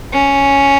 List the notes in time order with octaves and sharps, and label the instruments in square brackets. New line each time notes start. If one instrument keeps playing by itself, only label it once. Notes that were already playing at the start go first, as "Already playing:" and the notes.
[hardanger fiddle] C#4